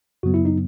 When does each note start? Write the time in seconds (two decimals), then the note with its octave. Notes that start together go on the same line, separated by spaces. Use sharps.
0.23 F#2 C#3 F#3 B3 F#4
0.34 E4
0.45 D#4